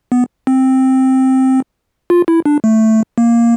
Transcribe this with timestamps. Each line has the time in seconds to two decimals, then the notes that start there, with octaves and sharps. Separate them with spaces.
0.12 B3
0.47 C4
2.10 F4
2.28 E4
2.45 D4
2.64 A3
3.18 A#3